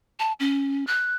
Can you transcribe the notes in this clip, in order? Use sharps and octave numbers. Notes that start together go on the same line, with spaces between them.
A5
C#4
F#6